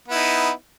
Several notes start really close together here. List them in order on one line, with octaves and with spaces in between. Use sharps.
B3 E4 D#4